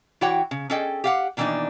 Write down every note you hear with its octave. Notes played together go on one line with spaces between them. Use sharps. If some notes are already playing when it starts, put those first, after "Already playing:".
E3 E4 F#4 C#5 F#5 G5
C#3
C#4 G#4 A4 D#5 G5
G4 F5 F#5
B2 D#3 E3 A#3 D4 D#4